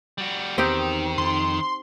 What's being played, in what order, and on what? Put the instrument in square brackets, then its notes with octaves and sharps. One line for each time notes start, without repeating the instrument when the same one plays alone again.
[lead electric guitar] G3 F#4
[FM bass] E2 [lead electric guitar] D#3 [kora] C4 D#4 G4
[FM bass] F2 [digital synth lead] C6